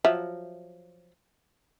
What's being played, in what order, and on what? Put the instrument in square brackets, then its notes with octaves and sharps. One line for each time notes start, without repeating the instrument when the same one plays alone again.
[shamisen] F3 F#3 E5